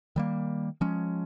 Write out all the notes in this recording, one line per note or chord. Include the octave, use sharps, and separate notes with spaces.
D#3 G3 A#3
F3 G#3 C#4